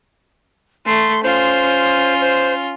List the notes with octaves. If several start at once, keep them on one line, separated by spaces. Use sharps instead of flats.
A3 C6
C#4 F4 C5
C5